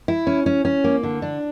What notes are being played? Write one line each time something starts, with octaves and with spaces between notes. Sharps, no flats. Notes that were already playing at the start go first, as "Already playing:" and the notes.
E4
C#4
C#4
C#4
A#3
D3
D4